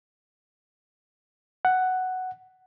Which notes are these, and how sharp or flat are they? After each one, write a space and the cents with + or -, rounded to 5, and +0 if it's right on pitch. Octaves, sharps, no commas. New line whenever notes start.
F#5 +5